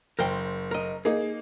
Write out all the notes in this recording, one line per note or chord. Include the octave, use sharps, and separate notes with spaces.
F#1 A#4 C5 G5
A#4 D#5
A#3 D#4 G#4